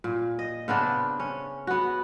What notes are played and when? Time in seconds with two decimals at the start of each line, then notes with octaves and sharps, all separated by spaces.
0.04 A#2
0.39 D#5
0.68 C#3 B3 C4 D4
1.20 C#4
1.67 B3 F#4